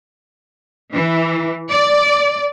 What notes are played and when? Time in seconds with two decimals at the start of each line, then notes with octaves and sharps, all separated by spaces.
0.92 E3
1.71 D5